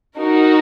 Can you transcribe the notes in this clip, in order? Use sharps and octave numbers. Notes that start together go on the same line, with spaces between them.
D#4 F#4 A#4